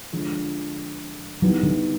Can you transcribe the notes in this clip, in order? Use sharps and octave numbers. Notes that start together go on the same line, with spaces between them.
D3 F3 G#3
D#3 F#3 G3 B3 E4
D3